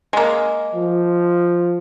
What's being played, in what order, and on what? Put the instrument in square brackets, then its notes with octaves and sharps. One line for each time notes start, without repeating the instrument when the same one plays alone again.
[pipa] G#3 A#3
[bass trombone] F3